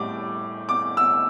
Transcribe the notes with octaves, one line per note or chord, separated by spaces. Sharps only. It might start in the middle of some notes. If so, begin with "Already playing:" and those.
Already playing: A2 G3 D6
D6
E6